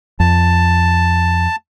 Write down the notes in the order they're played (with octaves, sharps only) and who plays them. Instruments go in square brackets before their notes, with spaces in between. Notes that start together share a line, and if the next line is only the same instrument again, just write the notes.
[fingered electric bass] F2 [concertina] A5